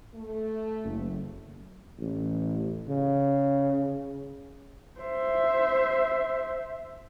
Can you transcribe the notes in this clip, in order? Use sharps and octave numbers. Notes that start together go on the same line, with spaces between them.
A3
F#1
A1
C#3
C5 E5